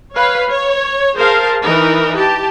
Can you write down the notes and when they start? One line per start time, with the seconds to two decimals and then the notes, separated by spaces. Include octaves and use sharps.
0.15 B4 C#5 F5
0.48 C#5
1.16 G#4 A#4 C5 F5 A5
1.63 E3 D#4 A#4 B4
2.16 G4 A5